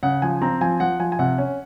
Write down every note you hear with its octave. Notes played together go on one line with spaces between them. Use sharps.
C#3 F#5
F3 G#5
C4 A#5
F3 G#5
F3 F#5
F3 G#5
G#5
C3 F#5
C#4